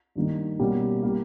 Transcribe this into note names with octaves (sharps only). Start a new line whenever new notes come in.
G2 D#3 A#3 D#4
B2 G3 A#3 C#4
G3 A#3